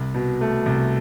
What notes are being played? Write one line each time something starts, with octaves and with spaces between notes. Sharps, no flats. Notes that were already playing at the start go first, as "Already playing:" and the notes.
Already playing: C2
B2
A3
C2